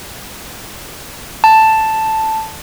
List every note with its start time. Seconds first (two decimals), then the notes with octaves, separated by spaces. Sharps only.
1.44 A5